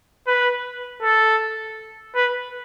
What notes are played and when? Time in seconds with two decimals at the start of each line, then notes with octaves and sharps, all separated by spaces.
0.27 B4
1.03 A4
2.15 B4